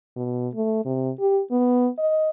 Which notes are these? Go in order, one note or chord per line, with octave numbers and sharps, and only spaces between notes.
B2
A3
C3
G4
B3
D#5